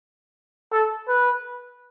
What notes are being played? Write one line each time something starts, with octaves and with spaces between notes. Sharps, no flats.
A4
B4